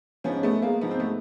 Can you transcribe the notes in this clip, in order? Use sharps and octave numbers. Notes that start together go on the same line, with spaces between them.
G#2 F3 B3 C#4
A3 B3
G#3 A#3
G#2 F3 B3
C4
A3 B3